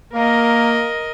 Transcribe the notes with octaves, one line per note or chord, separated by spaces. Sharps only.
A#3 A#4 D#5